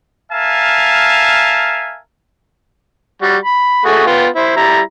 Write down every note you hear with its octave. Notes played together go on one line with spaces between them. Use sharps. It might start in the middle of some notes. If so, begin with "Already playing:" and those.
A#4 E5 F5 G#5 A5
G3 F#4
B5
A3 F#4 G#4
B3 F4 G5
E4 C5
G3 E4 A#5